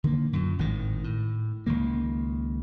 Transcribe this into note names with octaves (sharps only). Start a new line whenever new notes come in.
D3 D#3 A#3
F#2 A#2
G#1 A2 D#3
A2
C#2 D#3 A#3